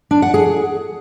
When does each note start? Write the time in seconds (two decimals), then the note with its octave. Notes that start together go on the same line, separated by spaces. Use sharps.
0.11 D4
0.22 F#5
0.34 G#4